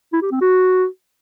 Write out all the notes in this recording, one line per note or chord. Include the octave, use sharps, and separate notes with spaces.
E4
G4
C4
F#4